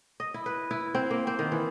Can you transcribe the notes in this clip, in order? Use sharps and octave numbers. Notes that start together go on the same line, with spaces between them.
D#5
E4
B4
E4
C4
A#3
C4
D#3
E3